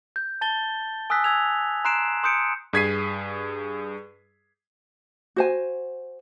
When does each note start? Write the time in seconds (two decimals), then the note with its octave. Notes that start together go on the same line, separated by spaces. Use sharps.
0.16 G6
0.41 A5 A6 G7
1.10 G#5 D#6 E6 F#6 B6
1.24 E6 G#6 F7
1.85 A#5 C6 F#6 C7 D7 E7
2.24 C6 D#6 G6 C#7 D7
2.73 G2 G#4 G#6 B6 C7 D#7
5.36 F#4 C5 G#5